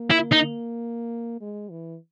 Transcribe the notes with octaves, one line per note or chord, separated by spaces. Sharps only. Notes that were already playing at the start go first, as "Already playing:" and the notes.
Already playing: A#3
E4
D#4
G#3
E3